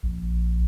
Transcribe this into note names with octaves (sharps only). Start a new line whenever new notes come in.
A#1